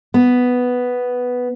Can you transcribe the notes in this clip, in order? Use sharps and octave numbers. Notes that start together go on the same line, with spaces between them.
B3